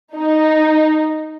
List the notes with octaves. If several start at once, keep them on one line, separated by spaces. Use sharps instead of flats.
D#4